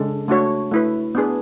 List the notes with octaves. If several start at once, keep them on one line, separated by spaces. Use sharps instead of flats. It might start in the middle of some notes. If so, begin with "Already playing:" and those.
Already playing: C#3 G#3 D4 A4
A3 D4 F#4 C#5
A3 E4 B4
B3 D4 G#4 B4